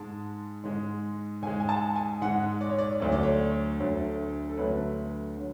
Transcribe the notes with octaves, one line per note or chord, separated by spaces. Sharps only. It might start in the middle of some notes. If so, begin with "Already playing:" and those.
Already playing: G#2 G#3 A5
G#2 G#3
G#2 G#3 G#5
G#5
A5
G#5
G#2 G#3 F#5
D5
C#5
D5
D2 D3 F#3 A3 C#5
D5
C#5
D2 D3 F#3 A3
A4
D2 D3 F#3 A3 B4
D3 F#3